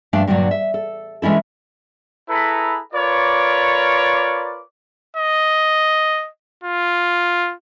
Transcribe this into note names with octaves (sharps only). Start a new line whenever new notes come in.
G2 F3 A3 D4 F5
G2 A#2 D3 D#3 F#3
E5
A4
E3 G#3 C#4 E4 A4
E4 G#4 A4 B4 A#5 B5
F4 A#4 B4 C#5 D5
D#5
F4